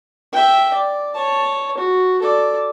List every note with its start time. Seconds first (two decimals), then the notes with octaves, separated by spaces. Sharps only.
0.32 E5 G5
0.74 D5
1.14 C#5 A5
1.77 F#4
2.22 A4 D5